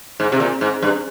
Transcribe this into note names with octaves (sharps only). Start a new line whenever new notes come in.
G#2
C3
A#2
G#2
G2